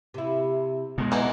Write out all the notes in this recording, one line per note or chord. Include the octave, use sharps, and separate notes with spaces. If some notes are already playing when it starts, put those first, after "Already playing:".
C3 E4
B2 G#3
E3 B3 D#4 A4 C5